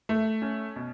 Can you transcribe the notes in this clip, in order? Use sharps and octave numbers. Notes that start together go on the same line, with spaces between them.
A3
C#4
B2